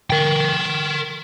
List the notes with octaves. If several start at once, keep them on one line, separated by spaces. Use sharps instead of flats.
A#4 G5